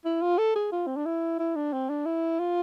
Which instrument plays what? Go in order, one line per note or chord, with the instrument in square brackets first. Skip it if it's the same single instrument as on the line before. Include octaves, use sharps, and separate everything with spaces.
[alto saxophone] E4
F4
A4
G#4
F4
C4
D4
E4
E4
D4
C4
D4
E4
F4